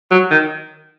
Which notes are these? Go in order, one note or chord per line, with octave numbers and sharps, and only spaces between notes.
F#3
D#3